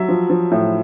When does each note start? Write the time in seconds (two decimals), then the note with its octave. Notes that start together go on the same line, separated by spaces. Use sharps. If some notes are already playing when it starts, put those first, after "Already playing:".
Already playing: F#3 E5
0.09 F3
0.30 F3
0.51 A2